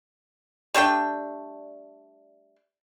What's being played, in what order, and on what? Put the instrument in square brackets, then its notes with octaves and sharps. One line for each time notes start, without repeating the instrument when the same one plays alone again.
[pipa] G3 A3 D4 G5